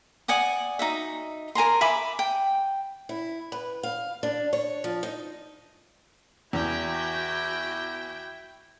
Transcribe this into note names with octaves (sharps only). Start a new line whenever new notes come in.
D5 F#5 G#5 D#6
D#4 F#4 E5
A#4 G#5 A#5 C6
E5 G#5 B5 D6
G5
E4
B4
F5
D4
C#5
F3
D#4
E2 E4 F#4 G5